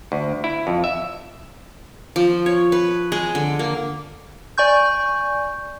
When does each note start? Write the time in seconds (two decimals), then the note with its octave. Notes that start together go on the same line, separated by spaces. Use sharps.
0.12 D2
0.44 E4
0.67 F2
0.84 E5
2.16 F3
2.46 C#5
2.72 B4
3.12 G#3
3.35 D3
3.59 A#3
4.58 D5 G#5 C#6 G6